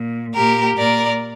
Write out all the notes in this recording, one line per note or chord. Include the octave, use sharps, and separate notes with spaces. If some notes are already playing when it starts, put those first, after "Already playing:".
Already playing: A#2
A#2 G4 A#4
A#2 A#4 D5